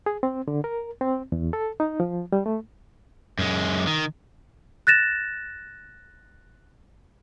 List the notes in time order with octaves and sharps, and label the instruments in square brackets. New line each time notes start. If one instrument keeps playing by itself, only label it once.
[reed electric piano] G#4
C4
D3
A#4
C4
E2
A4
D#4
F3
G3
A3
[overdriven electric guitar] F#2 G#3
D#3
[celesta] F#6 A6 A#6 E7